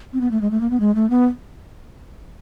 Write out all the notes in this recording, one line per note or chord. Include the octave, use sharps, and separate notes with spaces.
C4
B3
A3
G#3
A3
A#3
B3
G#3
A3
B3